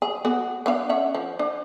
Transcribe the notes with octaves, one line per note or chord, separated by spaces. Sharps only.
G#4
B3 F#4 G#4
B3 D4 F5
C#4 E5 F#5
F3
D4